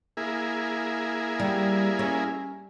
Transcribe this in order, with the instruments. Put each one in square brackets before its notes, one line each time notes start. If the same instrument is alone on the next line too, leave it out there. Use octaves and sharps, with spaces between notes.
[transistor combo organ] A#3 E4 G#4
[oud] G3
C#4